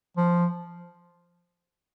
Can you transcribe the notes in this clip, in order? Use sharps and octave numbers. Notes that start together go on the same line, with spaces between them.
F3